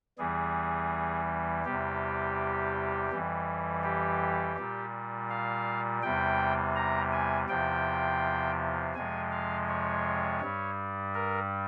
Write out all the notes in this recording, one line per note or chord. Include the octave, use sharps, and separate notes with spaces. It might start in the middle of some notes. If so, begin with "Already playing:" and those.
E2 E3 G3 G#4
E2 C3 G3 G4
F2 E3 G3
G4
A#2 G3
F5
E2 C3 G3 G5
A#5
G#5
E2 C3 F3 G5
F2 C3 F3 G#3 G#5
F5
C#5
G2 G3
A#4